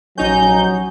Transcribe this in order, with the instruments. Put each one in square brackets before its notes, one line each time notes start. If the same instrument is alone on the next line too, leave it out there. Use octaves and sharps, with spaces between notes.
[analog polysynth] A#1 D#4 G6 [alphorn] F#3 [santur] C#4 G#5